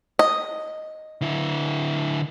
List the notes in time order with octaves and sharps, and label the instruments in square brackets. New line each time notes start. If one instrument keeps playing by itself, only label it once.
[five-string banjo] D#5
[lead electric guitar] D3 E4